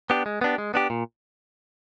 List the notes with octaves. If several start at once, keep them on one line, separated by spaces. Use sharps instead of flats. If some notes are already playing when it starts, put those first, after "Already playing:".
B3 D4 G4
G#3
B3 D4 G4
G#3
B3 D4 G4
A#2